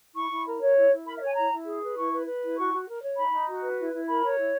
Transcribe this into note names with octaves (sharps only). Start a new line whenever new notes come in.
E4 C#6
E4
A#4
C#5
E4
E4
A#4 B5
E5
C#5 G#5
E4 A#5
E4
G#4
B4
E4 C#6
B4
B4
E4
F#4 C#6
F#4
A#4
C#5
D#4 B5
D#4
F#4
B4
E4
E4
A#4 B5
C#5
E4